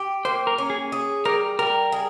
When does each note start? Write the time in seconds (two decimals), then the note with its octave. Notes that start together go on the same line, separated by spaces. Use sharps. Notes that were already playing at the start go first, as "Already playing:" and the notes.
Already playing: G4
0.25 A#3 C5
0.47 A#4
0.58 C#4
0.70 G#4
0.92 G#4
1.25 G3 A#4
1.59 G3 A#4
1.92 G#4